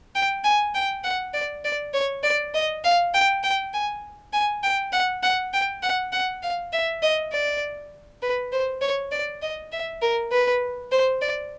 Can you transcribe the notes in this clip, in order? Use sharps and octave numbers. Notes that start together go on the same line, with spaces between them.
G5
G#5
G5
F#5
D5
D5
C#5
D5
D#5
F5
G5
G5
G#5
G#5
G5
F#5
F#5
G5
F#5
F#5
F5
E5
D#5
D5
B4
C5
C#5
D5
D#5
E5
A#4
B4
C5
D5